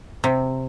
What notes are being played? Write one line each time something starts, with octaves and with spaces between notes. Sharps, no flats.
C3